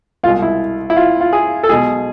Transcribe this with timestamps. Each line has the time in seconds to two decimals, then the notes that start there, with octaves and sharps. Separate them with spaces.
0.23 C2 F4
0.26 B2 G#3
0.42 E4
0.90 E4
0.96 F4
1.21 F4
1.33 G#4
1.63 A4
1.69 B1 B2 G#3 G#4